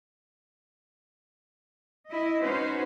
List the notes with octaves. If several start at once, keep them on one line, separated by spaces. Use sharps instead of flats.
E4 D#5
C#4 D#4 F#4 B4 C5